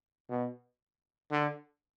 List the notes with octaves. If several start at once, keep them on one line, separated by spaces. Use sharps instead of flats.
B2
D3